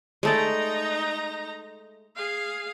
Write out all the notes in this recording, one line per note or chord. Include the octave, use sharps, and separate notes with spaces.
G#3 A3 D#4 D5 A#5
G#4 F5